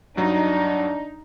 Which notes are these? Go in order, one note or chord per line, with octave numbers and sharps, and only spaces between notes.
G2 F#3 D4 D#4